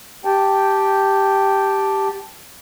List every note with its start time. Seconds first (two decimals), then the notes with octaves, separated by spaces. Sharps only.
0.25 G4 G5 A5